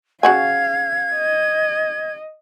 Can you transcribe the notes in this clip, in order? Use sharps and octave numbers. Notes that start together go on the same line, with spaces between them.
C#3 F#4 F5 G#5 G#6
D#5